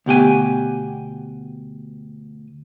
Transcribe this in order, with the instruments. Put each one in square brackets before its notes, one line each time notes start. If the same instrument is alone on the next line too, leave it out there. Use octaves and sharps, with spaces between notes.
[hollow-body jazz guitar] D2 B2 G4 G#5